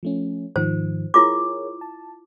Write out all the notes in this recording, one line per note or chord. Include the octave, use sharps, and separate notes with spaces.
F3 A3 C#4
G#2 D#3 F3 C5
E4 F4 G#4 A#4 C#5 D6
A5